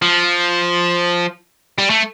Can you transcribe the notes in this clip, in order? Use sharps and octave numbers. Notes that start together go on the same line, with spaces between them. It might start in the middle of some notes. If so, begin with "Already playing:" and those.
F3
G3
A3